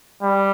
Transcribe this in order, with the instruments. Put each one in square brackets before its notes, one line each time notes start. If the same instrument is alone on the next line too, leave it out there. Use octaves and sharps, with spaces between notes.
[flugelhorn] G3